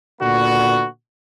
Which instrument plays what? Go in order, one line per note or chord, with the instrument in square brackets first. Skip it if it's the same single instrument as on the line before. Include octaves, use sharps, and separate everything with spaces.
[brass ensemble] A#2 D3 B3 F#4